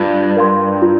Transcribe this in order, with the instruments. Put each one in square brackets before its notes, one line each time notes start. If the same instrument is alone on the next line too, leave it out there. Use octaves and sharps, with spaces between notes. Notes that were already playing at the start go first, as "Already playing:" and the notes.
Already playing: [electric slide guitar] G2 [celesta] F4
[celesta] A#4 F5 C6
F4